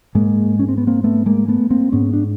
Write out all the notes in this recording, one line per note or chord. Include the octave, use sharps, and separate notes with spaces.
G#2 G#3 A#3
C#4
C4
B3
A#3 C4
A3 B3
G#3 A#3
A3 B3
A#3 C4
G#2 B3 C#4
D4